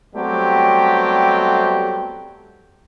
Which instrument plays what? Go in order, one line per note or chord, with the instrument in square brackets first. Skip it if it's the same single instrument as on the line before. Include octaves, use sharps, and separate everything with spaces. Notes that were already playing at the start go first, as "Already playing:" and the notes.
[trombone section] F#3 G3 A3 B3 C4 G4